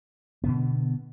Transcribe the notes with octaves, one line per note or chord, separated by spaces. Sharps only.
B2 D3 B3